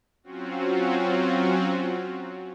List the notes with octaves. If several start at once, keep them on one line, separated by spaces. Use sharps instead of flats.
F#3 C4 C#4 F4 F#4